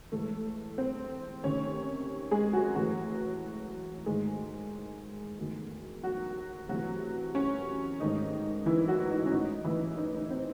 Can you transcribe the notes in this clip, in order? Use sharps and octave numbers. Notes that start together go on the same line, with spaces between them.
A2 E3 G#3 A3 A4
C4 C5
C3 D#3 A3 C#4 C#5
G#3 G#4
F#3 F#4
A2 E3 F#3 A3 F#4
G#2 D#3 G#3 A3 G#4
E2 D#3 F#3 A3
F#3 F#4
C3 E3 F#3 A3 F#4
C#4
G#2 D#3 A3 D#4
E3 E4
F#3 F#4
D#4
C#4
A2 G#3 D#4
E3 E4
D#4
D#4
C4 C5